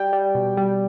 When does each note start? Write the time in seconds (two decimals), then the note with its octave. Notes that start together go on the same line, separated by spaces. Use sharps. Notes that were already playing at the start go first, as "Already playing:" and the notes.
Already playing: G3 G5
0.13 G3
0.35 B2
0.57 G3